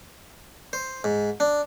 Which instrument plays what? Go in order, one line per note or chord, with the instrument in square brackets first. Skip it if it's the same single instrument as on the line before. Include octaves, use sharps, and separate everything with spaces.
[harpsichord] C5
G#2
D4